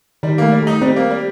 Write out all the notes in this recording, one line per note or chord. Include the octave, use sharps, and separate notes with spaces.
D#3 G3
A3 A#3
G3
A3 D#4
G3 C4
A#3
G3